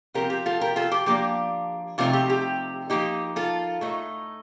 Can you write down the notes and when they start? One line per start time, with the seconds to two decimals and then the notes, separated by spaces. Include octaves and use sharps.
0.14 F3 C4 F4 G4 A#4
0.30 G4
0.46 F4 A4
0.61 G4 A#4
0.76 F4 A4
0.91 G4
1.06 F3 A#3 D4 G4
1.98 C3 F3 A3 C4 D#4 F4
2.13 G4
2.30 G4
2.90 F3 A#3 D#4 G4
3.36 F4 A4
3.81 A2 A3 D#4